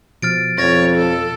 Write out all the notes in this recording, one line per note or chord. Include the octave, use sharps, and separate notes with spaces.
B2 F3 F6 A6 D7
F2 C#5 A6 A#6
A4